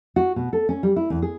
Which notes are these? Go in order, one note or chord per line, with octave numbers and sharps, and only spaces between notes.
F#4
B2
A4
C#4
G3
E4
E2
G#4